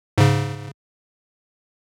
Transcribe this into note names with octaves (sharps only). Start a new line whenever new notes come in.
G#2 C#3